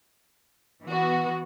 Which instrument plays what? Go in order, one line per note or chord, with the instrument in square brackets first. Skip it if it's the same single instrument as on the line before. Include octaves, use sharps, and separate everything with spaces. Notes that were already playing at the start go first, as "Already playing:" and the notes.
[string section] E3 B3 F#4